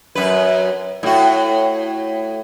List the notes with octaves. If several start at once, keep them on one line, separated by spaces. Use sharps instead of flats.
F#2 B4
A2 F#4